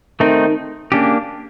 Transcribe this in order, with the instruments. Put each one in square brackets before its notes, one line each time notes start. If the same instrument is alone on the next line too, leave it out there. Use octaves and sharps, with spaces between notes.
[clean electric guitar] D#3 [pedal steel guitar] A3 C4 D#4
[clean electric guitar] C#3 [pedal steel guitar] A#3 D4 G4